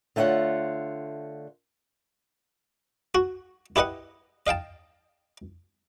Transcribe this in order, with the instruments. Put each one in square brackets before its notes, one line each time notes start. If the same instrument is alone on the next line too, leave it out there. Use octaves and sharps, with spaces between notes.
[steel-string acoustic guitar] D3 A3 F4 C#5 F#5
[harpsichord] F#4
E4 G4 B4 D#5 F#5
D#5 F5 G5 A5